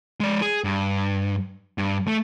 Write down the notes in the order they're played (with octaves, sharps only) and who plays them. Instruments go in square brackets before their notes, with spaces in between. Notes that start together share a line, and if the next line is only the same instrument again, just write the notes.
[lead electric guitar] G#3 D5
G#4
G2
G2
A3